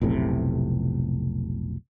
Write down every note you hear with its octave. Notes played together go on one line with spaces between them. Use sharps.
F1 B1 A2 C3